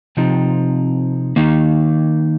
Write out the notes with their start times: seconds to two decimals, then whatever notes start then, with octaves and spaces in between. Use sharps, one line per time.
0.17 C3 F3 C4 D#4
1.36 D#3 A#3 D#4